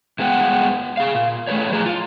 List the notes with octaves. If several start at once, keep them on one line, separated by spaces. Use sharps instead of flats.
G2 G#3 B3 G#4 F#5 G5
G#4 F5
A#2
A3 A4 B4 C#5
F3 G#4 A#5
F4